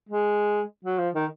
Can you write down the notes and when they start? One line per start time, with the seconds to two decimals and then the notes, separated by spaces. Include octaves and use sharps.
0.09 G#3
0.85 F#3
0.99 F3
1.15 D#3